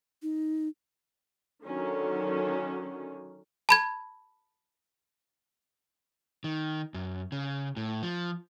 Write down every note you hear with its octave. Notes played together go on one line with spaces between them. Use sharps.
D#4
D3 D#3 F#3 C#4
A5 B5 G#6
D#3
F#2
C#3
A2
F3